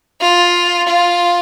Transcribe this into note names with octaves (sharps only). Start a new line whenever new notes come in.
F4
F4